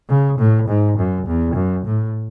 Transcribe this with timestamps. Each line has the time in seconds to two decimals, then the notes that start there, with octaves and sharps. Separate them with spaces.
0.09 C#3
0.39 A2
0.68 G#2
0.98 F#2
1.27 E2
1.55 F#2
1.85 A2